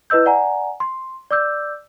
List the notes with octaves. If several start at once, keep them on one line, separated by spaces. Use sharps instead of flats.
E4 B4 D#5 E6 G6
D5 F#5 G#5 A#5
C6
D5 D6 E6 G6